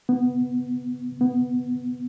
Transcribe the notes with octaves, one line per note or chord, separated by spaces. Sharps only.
B3
B3